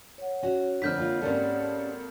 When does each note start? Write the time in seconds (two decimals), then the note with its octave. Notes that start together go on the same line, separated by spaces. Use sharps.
0.18 C#5 F#5
0.42 C#4 F#4
0.82 F2 D3 A#4 C5 F6 G6 B6
0.98 A#3 F4
1.22 G#1 G3 A#3 C#4 A4